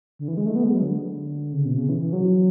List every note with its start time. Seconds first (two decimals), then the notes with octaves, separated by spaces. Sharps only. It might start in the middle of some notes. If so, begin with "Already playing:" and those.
0.19 D3
0.28 E3
0.37 G#3
0.46 A3
0.55 B3
0.64 G#3
0.73 F#3
0.82 D3
1.53 C#3
1.65 B2
1.77 C#3
1.89 E3
2.01 E3
2.13 F#3